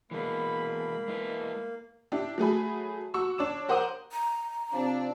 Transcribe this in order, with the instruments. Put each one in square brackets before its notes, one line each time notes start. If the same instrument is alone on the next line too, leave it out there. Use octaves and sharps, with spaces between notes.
[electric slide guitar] E3 G#3 B3 [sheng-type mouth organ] A#3 [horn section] B5
[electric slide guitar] G#3 E4 B4
[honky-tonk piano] D4 E4 G4
F#3 A3 G#4 B5
F#4 C#6 E6
D4 C#5 D6 E7
A#4 C5 F#5 A#5 D6 D#6
[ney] A#5
[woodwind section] C3 F3 C4 [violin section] D4